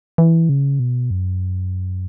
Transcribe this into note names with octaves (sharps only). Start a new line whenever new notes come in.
E3
C#3
B2
F#2